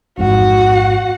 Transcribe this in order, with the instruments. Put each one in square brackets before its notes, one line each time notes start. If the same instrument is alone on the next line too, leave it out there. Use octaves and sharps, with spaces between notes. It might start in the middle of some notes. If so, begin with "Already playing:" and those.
[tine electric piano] A1 F2 G#2 [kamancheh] F#4 F#5